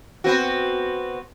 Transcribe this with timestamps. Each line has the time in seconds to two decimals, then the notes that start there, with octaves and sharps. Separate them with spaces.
0.24 B3 C4 F#4